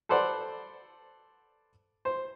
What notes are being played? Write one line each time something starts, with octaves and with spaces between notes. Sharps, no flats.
A4 B4 C5 D5 F#5
C5